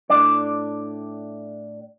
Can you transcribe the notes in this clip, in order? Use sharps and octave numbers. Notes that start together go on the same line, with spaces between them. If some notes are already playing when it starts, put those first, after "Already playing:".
A2 D4 D5